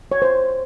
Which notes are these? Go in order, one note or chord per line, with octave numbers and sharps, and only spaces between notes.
C#5
C5